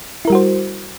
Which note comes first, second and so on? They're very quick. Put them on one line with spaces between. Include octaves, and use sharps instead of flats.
E4 A#4 G3 F#4 C5